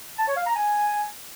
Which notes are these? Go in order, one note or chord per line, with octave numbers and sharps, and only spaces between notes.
A5
C#5
F5
A#5
G#5